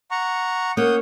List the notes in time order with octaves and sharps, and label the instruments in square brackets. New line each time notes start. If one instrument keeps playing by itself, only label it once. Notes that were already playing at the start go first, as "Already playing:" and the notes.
[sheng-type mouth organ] F#5 A#5 C#6
[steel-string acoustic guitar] A#3 C#4 C#5 [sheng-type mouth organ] F#5 D#6 G6